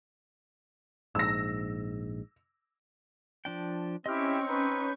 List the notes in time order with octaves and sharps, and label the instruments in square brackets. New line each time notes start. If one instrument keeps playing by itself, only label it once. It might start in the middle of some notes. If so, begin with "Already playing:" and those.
[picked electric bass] A#1 G#2 [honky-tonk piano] E6 A#6
[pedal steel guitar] F3 D4 G5
[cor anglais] C4 [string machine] C#4 C#6 [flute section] E4 G4 [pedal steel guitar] D#5 F6
[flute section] D#4 B4 G6